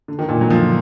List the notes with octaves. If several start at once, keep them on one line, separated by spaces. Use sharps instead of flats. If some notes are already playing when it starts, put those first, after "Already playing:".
D3
D#3
A#2 D3
F#3
D3 F3